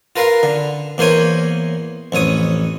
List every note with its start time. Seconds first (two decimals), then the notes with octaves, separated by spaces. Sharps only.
0.16 F4 A#4 B4 F5
0.43 D3
0.98 E2 A#3 C5 C#5 G#5
2.12 A1 F2 C#5 D#6